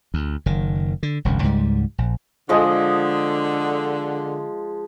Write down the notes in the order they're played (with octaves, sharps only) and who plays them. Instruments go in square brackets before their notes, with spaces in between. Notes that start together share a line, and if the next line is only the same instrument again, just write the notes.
[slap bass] D2
F#1 D#3
D3
E1 C2 F#2 D3
C#2 G#2 G3
A#1
[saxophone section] D3 [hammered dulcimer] F3 G#3 D#5